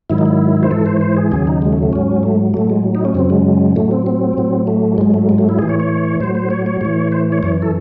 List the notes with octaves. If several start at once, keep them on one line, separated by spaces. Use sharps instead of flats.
G#2 D#3 F#3 E4
D#4
E4
C5
G#2 E3 A4
C5
C5
G#4
D#2 C#3 F#3 G#4
D#4
G#3
A3
A3
G#2 F#3 C#4
A3
A2 F#3 A3
G#3
D#4
C#4
F#2 C#3 F#3 C4
G#3
A2 F#3 A3
C4
C4
A2 F#3
A3
G#2 F#3 G#3
A3
G#3
A3
E4
A2 E3 G#4
C#5
C#5
A2 F#3 C5
C5
C#5
C#5
A2 E3 C#5
C5
C#5
F#2 E3 C#5
A4